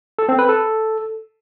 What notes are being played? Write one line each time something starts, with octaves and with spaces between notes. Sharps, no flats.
A4
C4
B4
A4